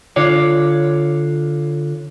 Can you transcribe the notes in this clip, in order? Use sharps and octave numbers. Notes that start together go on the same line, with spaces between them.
D3 F4 C#5 D5